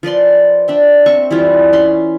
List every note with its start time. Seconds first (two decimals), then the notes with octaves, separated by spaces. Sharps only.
0.03 F3 B4 D5 C6
0.68 D4 E5 G5
1.06 C4 E5 C#6
1.31 E3 G3 E4 F4
1.73 C#4 B5 C6